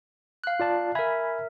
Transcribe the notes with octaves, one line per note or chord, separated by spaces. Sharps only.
F5 F#6
F4 D5 A5
A#4 E5 G#5 B5 G#6